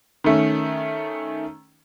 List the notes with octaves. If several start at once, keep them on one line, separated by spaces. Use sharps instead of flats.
D#3 A3 C#4